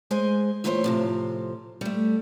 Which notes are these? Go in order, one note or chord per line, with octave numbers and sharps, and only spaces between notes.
G#3 G#4 C5 G#5
D2 A#2 E3 A3 C5 C#5
A2 C3 F3
G3 A3